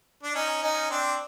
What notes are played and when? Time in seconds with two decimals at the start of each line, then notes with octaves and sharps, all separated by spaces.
0.23 D4
0.35 C#4 D#4
0.63 C#4 D#4
0.90 C4 D4